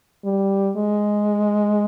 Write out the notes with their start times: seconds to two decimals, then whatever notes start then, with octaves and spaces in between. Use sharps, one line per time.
0.25 G3
0.76 G#3